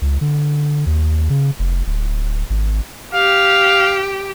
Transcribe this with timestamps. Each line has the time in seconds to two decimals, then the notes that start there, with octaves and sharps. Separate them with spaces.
0.02 C#2
0.21 D3
0.86 D#2
1.30 C#3
1.59 F1
1.86 D1
2.50 G#1
3.14 G4 F5